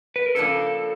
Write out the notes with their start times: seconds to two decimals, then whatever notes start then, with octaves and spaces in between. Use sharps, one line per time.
0.16 B4
0.26 A#4
0.35 C#3 F3 A#3 D4 A4